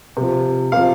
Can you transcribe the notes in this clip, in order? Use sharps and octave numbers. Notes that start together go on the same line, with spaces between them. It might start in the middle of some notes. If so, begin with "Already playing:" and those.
C3 F3
C3 F3 F5